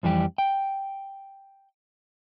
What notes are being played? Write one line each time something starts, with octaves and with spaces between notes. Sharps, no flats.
F2 E3 G3 G4
G5